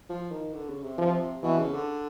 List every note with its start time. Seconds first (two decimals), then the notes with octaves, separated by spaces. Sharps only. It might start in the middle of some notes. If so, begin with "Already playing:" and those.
0.09 F3
0.31 D#3
0.54 D3
0.69 C#3
0.83 C3
0.98 F3
1.43 B2 E3
1.58 C#3
1.74 D3